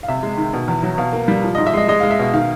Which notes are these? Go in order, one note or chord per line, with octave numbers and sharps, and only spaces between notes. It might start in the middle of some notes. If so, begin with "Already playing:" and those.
F5
C3 E5
G#3
D#3
B2
E2
F#3
B2 F5
A#3
G3
F3
G#2 D#5
E5
G#3 D#5
G#3 D#5
G#3 F5
E5
B2 F5
D#3 F5